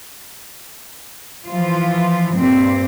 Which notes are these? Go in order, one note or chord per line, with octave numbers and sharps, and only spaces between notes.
E3 F3 F4
G2 A#2 C4